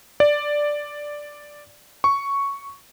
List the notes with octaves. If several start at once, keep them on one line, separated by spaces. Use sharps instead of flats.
D5
C#6